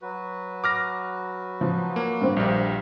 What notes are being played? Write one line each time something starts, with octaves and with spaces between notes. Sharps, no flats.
F#3 F#4 B4
D6 F6 A#6
F3
A#3
G2 C4
A#1 G3 F5